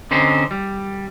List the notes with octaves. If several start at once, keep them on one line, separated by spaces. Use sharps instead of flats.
D3 C4 C#4 D#4 C5
G3